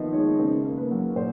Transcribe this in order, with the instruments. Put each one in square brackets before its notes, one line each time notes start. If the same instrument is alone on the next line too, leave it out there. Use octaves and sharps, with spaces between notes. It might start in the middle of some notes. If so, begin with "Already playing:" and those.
Already playing: [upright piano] D#3 F3 B3 D#5 E5
G#3 C#5
C#3 C5
A#3
B4
F#3
A#2 C5